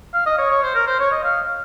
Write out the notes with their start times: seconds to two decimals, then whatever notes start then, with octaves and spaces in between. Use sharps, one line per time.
0.14 F5
0.26 D#5
0.38 C#5
0.51 C#5
0.63 C5
0.75 A#4
0.87 C5
1.00 C#5
1.11 D#5
1.23 F5